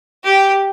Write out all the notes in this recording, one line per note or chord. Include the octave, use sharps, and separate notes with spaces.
G4